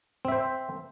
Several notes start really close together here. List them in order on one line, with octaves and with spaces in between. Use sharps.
C4 E5 C5